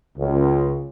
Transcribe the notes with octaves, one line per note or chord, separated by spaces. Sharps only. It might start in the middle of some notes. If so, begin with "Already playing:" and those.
C#2